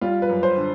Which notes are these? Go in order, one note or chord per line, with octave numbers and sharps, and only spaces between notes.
G3 F4
B4
F#2
C5
D3